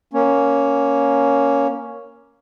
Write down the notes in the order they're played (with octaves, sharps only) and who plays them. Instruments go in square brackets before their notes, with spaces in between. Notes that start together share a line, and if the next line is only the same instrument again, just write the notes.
[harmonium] A#3 C#4